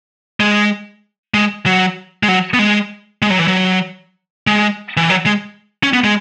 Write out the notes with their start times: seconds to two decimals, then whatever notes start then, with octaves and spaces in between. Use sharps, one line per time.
0.40 G#3
1.34 G#3
1.66 F#3
2.23 G#3
2.28 F#3
2.54 B3
2.59 G#3
3.22 G#3
3.30 F#3
3.39 E3
3.48 F#3
4.47 G#3
4.97 E3
5.10 F#3
5.26 G#3
5.83 C#4
5.94 B3
6.04 G#3